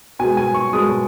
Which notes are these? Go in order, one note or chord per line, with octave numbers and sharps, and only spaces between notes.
B2 G#3 G#5
G#5
C#6
B2 G#3 D#6